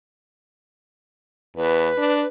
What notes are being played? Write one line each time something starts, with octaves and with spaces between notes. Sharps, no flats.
E2 B4
D4